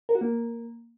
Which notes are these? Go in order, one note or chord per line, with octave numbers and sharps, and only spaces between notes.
A#4
F#4
A#3